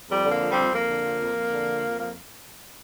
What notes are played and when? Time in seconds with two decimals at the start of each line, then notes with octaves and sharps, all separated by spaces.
0.09 F2 G3
0.25 D3 A#3
0.41 F3
0.51 G3 C4
0.57 F2
0.72 F2 A#3
0.87 D3
1.04 F3
1.20 F2
1.36 F2
1.51 D3
1.66 F3
1.83 F2
1.97 F3 A#3